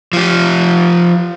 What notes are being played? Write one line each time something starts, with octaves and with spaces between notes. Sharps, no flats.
F3 G4